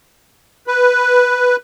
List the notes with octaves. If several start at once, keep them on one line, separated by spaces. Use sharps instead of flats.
B4